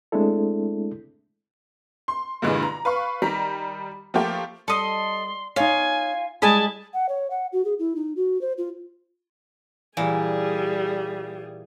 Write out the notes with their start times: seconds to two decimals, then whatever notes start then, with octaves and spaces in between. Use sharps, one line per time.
0.12 G#3 A3 C4 D4 E4 A4
2.08 C6
2.42 G2 A#2 D3 E3 G#3
2.63 A#5
2.85 B4 F5 C#6
3.22 D#3 G3 A#5 B6
4.14 F3 A3 A#3 F4 G4
4.68 G3 A4 D#5 C6
5.56 D#4 F4 C#5 G#5
6.42 G3 G#3 E4 G#4 D#5 G#5 A5
6.94 F#5
7.09 C#5
7.30 F#5
7.52 F#4
7.65 G#4
7.79 E4
7.96 D#4
8.16 F#4
8.41 C5
8.58 F4
9.97 A#2 E3 G3 G#4